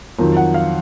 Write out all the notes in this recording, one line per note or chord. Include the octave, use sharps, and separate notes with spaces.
F2 D#3 F#3
F#5
F5